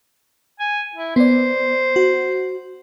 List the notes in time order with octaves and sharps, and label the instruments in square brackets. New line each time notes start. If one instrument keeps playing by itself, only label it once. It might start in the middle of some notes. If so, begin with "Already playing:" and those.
[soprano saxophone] G#5
E4
[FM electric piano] B3 D5 [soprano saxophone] C5
[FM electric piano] F#4